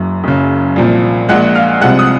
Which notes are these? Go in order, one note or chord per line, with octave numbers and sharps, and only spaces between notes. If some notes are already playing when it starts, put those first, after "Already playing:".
Already playing: F#1 F#2
F#1 F#2 C#3
C2 A#2 F3
A#1 A#2 G#3 F#5 F#6
F5 F6
C2 C3 F3 G#3 F#5 F#6
D#6